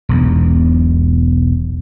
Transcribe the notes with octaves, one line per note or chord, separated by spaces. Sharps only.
E1 B1 E2